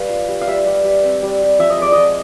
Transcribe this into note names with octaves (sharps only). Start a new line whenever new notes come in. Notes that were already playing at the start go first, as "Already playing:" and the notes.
Already playing: G3 B4 F5
F4
G3
F5
G3 E5
G3
G3
C4
G3
G3
F3 E5
D#5
G#3 D5
F3 D#5